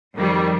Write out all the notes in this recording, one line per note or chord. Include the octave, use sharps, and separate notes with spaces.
F2 D#3 G3